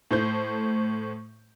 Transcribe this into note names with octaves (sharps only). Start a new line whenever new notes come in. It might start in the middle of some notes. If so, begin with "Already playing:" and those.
A2 A3 C5 G6